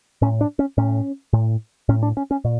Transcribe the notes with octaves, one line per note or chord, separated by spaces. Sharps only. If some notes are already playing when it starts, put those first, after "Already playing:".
A2 C#4
D4
C#4
A2 C#4
A2
A2 C#4
D4
C#4
C#4
A#2